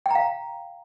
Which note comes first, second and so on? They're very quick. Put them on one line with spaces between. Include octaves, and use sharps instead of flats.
G5 A#5 F5